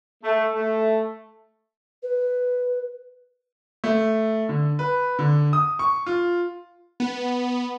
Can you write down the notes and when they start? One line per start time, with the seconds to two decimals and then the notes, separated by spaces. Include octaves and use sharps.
0.24 A3
0.55 A3
2.02 B4
3.84 A3
4.49 D3
4.79 B4
5.19 D3
5.53 D#6
5.79 C#6
6.06 F4
7.00 B3